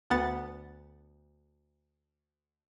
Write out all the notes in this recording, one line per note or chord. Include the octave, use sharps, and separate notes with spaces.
D2 B3 F#5 A6